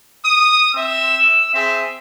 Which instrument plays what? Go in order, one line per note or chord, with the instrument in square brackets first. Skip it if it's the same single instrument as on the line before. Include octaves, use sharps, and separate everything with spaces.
[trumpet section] D#6
[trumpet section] C4 E5 [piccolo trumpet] E6
[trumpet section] C4 G#4 [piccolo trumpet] E5